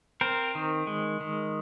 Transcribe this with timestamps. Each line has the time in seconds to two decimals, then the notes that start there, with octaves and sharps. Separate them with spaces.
0.21 C4 A#4 C5
0.55 D#3
0.87 G#3
1.21 D#3